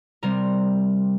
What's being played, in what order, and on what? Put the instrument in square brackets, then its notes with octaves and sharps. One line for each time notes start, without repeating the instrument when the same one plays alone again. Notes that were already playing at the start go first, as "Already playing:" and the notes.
[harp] C3 G3 C4 A#4